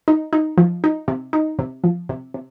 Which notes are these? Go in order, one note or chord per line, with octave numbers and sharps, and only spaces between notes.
D#4
D#4
F3
D#4
C3
D#4
C3
F3
C3
C3